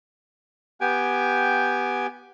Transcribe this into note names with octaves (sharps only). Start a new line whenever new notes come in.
B3 G4 G5 G#5